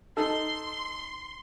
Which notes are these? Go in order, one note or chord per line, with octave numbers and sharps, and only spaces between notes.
D#4 A4 C6